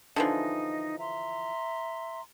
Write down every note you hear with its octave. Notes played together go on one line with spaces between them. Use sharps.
D3 E3 F3 D#4 D#5
E5 A#5 C6